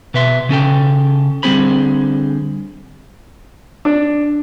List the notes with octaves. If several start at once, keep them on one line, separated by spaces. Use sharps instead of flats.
B2 B4 E5 C6
C#3 C#4 A4 G5
D3 G3 C4 G#4 C5 B5
D4